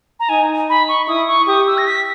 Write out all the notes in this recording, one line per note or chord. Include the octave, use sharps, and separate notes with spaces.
A#5
D#4 G#5
B5
C#6
E4 D#6
C#6
G4 D#6
E6
A#6
B6